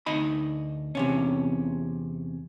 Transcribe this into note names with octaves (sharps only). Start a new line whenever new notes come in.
D2 D#4 D#5 B5
E2 C3 C#4